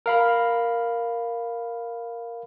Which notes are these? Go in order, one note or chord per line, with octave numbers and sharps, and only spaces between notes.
A#4 F5 B5